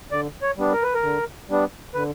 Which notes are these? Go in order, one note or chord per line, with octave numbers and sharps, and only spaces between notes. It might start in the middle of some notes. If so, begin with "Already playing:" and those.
D3 D5
C#5
G3 B3 D4
A#4
B4
A#4
D3
G3 B3 D4
D3 B4